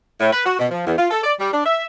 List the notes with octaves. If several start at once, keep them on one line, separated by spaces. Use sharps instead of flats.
A2
B4
F#4
B2
F3
E2
F4
A4
D5
G3
D4
E5